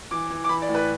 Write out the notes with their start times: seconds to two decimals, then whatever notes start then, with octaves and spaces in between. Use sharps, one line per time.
0.11 E3 D6
0.31 E3
0.44 D6
0.49 E3 B5
0.62 D5
0.69 A2
0.75 B4